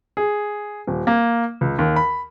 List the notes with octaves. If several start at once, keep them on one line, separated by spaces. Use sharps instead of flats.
G#4
D#1
A#3
C#2
D#2
B5